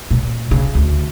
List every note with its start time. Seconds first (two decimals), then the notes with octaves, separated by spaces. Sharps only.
0.11 A#2
0.51 C#3
0.75 D2